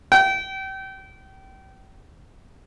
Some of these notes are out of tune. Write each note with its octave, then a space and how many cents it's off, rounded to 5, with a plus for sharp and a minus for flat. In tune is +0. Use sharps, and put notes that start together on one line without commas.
G5 -30